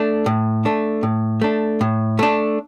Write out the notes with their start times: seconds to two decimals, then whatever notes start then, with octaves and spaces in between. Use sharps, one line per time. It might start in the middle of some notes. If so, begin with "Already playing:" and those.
Already playing: A3 D4
0.26 A2
0.65 A3 D4
1.03 A2
1.41 A3 D4
1.81 A2
2.19 A3 D4